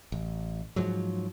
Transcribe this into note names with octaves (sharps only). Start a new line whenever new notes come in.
A1
G#2 F3 F#3